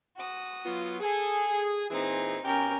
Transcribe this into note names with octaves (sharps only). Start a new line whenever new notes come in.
F#4 D#6
F#3 B3 F4
G#4 A4 G#5
A#2 E3 C4 D#4 G#4
B2 C#4 G4 A#4 G5